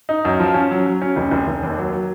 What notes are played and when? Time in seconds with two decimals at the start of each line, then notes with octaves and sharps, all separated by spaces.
0.09 D#4
0.25 F#2
0.40 F3
0.54 C#4
0.71 F#3
0.86 F#3
1.02 C#4
1.16 F1
1.31 F1
1.48 F1
1.63 D#2
1.78 F#3
1.93 F#3